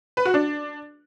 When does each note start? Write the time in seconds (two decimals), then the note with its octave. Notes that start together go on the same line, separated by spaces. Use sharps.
0.17 B4
0.25 F#4
0.34 D4